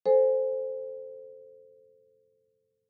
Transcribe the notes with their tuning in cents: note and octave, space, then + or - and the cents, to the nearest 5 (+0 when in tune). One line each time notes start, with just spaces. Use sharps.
A4 +0 C5 +0 G#5 +0